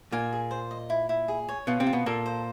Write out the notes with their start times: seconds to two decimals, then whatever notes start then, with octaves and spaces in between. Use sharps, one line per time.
0.12 A#2 A#3 G#5
0.33 G#4
0.51 C5
0.71 D#5
0.90 E4
1.09 E4
1.28 G#4
1.49 C#5
1.67 B2 B3 F4
1.80 C3 C4
1.87 F4
1.93 B2 B3
2.06 A#2 A#3 A4
2.26 C5